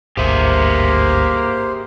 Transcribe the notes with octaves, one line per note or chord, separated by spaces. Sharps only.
G#1 D2 G2 A#3 G4 G#4 C5 E5